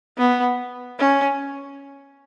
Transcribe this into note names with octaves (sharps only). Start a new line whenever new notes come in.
B3
C#4